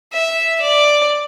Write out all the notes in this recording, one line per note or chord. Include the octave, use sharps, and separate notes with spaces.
E5
D5